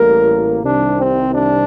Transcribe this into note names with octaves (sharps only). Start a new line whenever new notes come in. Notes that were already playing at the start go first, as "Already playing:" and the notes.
Already playing: A1 A2 G3 A#3 A#4
C2 C3 D#3 G3 D4
C4
D4